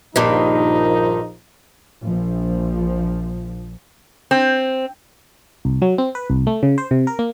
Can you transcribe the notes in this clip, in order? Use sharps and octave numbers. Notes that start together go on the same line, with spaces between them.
A#1 G2 A#2 D#3 F3 D#4
A#1 F3
C4
C2
F#3
C4
B4
C2
A3
C#3
C5
C3
A#4
A#3